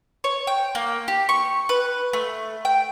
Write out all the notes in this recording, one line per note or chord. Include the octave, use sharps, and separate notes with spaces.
C#5
G5
A#3
G4
C#6
B4
A3
G5